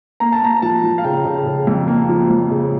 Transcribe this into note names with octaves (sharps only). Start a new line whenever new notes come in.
A#3 A#5
A5
A#3 A#5
F3 A5
F3
F5
C#3 G5
C#3
C#3
F2
A#3
F3
F2
C#3